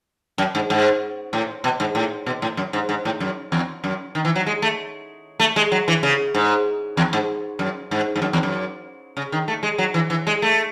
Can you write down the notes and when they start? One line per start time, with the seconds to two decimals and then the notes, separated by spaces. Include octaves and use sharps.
0.38 F#2
0.55 G#2
0.70 G#2
1.33 A2
1.64 B2
1.80 G#2
1.95 A2
2.26 B2
2.42 A2
2.57 F#2
2.73 G#2
2.89 G#2
3.05 A2
3.20 F#2
3.52 E2
3.84 F#2
4.15 D#3
4.25 E3
4.36 F#3
4.46 G#3
4.62 A3
5.40 A3
5.56 G#3
5.72 F#3
5.88 E3
6.03 C#3
6.35 G#2
6.97 E2
7.13 G#2
7.59 F#2
7.91 G#2
8.16 G#2
8.22 F#2
8.33 E2
8.43 F#2
9.17 C#3
9.32 D#3
9.48 A3
9.63 G#3
9.78 F#3
9.94 E3
10.10 E3
10.27 G#3
10.42 A3